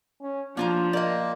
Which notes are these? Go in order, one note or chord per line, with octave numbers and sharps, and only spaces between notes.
C#4
F3 A#3 D4 F4 A#5
A#2 A#3 D5 D#5